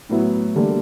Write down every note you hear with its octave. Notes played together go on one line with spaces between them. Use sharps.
A2 F#3 B3 E4
D3 G3 A#3